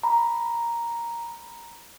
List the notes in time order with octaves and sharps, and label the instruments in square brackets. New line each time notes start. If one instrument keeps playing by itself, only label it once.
[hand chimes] A#5 B5